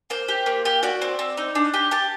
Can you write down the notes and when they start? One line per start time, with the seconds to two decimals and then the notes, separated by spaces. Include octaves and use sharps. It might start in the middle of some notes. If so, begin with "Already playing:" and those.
0.10 A#3 C5
0.29 G4
0.46 A#3
0.65 G4
0.83 F#4 D5
1.02 C4
1.19 C4
1.37 D#4
1.55 D4
1.74 G4
1.91 G4 A5